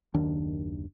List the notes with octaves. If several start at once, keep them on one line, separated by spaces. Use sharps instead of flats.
F#1 D#2 D#3 D4